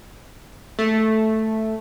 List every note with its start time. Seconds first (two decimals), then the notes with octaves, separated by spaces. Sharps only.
0.79 A3